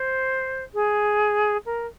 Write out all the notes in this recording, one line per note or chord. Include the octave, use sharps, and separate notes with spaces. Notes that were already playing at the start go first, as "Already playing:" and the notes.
Already playing: C5
G#4
A#4